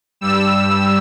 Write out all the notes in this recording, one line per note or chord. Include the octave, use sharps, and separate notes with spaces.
G2 G3 E6